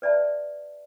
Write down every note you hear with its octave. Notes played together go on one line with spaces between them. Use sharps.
B4 D5 E5 A5